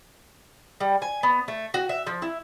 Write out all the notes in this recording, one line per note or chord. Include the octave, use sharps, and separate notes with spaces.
G3
G#5
B3
A3
F#4
E5
F3
E4